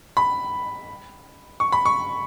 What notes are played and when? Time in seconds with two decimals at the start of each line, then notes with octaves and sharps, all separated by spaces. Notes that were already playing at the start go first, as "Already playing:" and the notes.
0.17 B5
1.60 C#6
1.72 B5
1.85 C#6